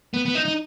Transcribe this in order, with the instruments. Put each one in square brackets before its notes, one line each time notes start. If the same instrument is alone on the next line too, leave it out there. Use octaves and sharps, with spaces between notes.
[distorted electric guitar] B3
B3
D#4
D#4